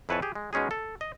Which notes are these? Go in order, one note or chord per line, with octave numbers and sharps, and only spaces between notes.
F2 E4 B4 C#5 G#5 A5
G4 G#4
G#3
B2 G#3 C#4 D#4 G#4
A4
D#5